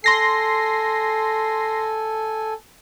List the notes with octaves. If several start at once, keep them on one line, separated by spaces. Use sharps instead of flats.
A4 G#5 C6 A#6 C7